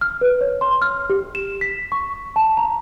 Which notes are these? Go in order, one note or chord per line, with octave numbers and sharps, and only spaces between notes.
F6
B4
C#5
C6
F6
G4
E7
B6
C#6
A5
A#5